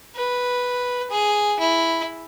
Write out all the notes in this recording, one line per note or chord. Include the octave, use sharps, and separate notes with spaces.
B4
G#4
E4